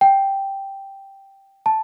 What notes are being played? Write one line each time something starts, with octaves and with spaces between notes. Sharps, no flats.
G5
A5